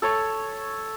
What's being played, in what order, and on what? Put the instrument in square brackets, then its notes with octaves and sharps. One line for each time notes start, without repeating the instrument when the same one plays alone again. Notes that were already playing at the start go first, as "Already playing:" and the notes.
[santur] A4 C#5